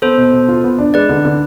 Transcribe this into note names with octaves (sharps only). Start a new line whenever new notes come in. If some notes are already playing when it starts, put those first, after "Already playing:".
B3 A4 C5
B2
B2
F4
B3
D4
G#3 B4 D5
D3
D3